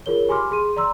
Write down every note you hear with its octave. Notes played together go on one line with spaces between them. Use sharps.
F4 G#4 A#4 C#5 G7
G4 G#5 B5 C6 D6 F6
G#4 C6 D#7
D5 A#5 C6 E6